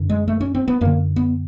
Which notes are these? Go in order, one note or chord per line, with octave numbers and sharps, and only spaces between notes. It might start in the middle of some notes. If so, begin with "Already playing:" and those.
Already playing: F#2 D3
G#3
A3
C#4
C4
B3
F#2 D3 A#3
B3